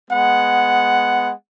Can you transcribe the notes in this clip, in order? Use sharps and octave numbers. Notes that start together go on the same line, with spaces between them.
G#3 B3 F#5